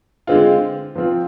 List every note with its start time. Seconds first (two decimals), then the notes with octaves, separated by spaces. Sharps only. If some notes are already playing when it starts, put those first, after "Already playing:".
0.27 D3 G#3 C4 F4
0.95 F3 C4 F4